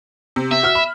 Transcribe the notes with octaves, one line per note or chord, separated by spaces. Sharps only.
C3
C3 E5
F#4 F6
B5